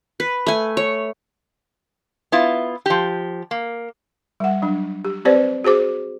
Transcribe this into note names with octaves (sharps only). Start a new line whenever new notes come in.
B4
A3 G#5
C#5
B3 E4 F4
F3 G4
A#3
G3 F#5
F#3 D4
G4
C4 G4 B4 C5 D5
F#4 G#4 C5 D6